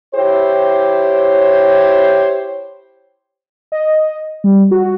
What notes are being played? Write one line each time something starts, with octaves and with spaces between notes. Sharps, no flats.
E4 G4 C5 C#5
D#5
G3
F#4